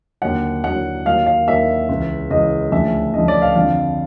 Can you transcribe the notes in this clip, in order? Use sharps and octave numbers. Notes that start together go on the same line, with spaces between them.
D#2 D3 F#3 F#5
D#2 D3 F#3 F#5
D#2 D#3 F#3 F5
F5
D#2 D#3 F#3 E5
C#2 C#3 E3
C#2 C#3 E3 D#5
D2 C#3 F3 E5
D2 C#3 F3 D#5
D5
F5
F2 D3 F3 F5